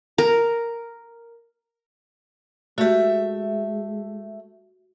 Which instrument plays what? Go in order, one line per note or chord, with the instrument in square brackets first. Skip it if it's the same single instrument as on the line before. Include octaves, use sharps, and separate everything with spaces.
[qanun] A#4
[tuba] G#3 [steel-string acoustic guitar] A3 E5 [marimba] F#4 G4